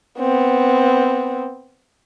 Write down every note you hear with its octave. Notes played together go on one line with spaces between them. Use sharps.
B3 C4